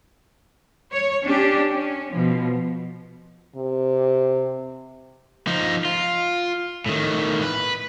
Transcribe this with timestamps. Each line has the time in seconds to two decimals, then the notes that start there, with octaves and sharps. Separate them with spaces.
0.92 C#5
1.24 C#4 D4 G4
1.73 C#4
2.13 B2 F3
3.56 C3
5.47 F3 D#4
5.85 F4
6.86 A2 D#3
7.42 B4